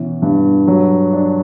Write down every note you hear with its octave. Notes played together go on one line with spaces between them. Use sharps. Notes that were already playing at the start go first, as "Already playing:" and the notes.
Already playing: B2 E3 C#4
G2
F#3
D4